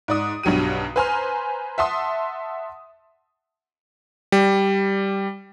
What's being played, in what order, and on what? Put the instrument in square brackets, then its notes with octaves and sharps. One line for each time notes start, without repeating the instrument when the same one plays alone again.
[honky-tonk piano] G#2 D5 D#6
B1 G2 F#3 G4 D#7
B4 C5 G#5 A#5 C6 F6
E5 F#5 A5 C6 D#6
[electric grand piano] G3